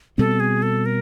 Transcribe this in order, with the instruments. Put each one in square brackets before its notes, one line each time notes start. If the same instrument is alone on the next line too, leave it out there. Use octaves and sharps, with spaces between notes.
[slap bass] B2 G3 C4 [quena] A4
[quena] G#4
A4
A#4